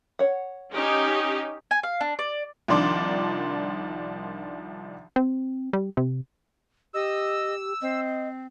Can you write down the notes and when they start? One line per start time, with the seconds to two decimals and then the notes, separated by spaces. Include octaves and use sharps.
0.19 C#5 F#5
0.73 C#4 D#4 G4
1.71 G#5
1.83 F5
2.01 D4
2.19 D5
2.68 C2 D#3 F3 D4 C6 D6
5.16 C4
5.73 G3
5.97 C3
6.94 G4 D#5 E6
7.82 C4 D#5